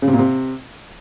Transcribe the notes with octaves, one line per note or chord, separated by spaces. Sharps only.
C#3
C3
A#2
C3